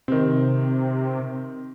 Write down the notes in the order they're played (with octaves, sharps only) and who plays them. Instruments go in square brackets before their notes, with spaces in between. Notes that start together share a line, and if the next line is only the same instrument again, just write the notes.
[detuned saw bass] C3 [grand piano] D#3 C4